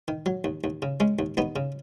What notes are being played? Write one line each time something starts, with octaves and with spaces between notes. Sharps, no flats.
D#3
F#3
D#2
D#2
C#3
G#3 C#4
D#2
D#2 B3 D#4
C#3